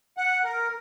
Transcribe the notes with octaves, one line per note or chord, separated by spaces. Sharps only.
F#5
A#4